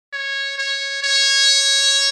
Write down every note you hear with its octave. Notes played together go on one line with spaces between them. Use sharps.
C#5
C#5
C#5